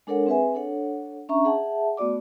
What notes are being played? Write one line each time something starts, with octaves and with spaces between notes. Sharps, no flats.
G#3 D4 A4 A#4 C#5 F#5
C4 G#4 B4 E5 G#5
D4 A4 C#5 F#5
C#4 D4 E5 A#5 C#6
G#4 E5 F#5 A5
A3 B3 F#4 D5 D6